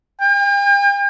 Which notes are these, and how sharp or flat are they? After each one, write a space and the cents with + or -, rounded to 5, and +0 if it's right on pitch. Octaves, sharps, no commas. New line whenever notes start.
G5 +45